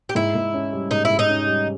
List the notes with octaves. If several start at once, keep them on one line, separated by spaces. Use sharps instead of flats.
G4
G#2 E4
G#2
C#4
G3
G#2 D#4
G#2 E4
D#4
C#4
G3